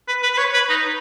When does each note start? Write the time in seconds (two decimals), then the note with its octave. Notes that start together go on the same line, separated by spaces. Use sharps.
0.08 B4
0.23 B4
0.34 B4
0.38 C#5
0.54 B4
0.70 D#4